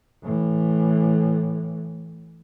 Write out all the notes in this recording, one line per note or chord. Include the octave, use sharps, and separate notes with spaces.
A2 E3